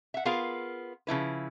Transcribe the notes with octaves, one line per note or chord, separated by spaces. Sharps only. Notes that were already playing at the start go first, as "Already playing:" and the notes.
E5 F#5
B3 F4 G#4 A#4 F5
C#3 F3 E4 B4